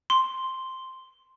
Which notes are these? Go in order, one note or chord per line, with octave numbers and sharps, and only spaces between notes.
C6